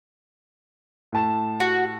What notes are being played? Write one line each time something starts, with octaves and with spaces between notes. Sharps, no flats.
A2 A5 E7
F#4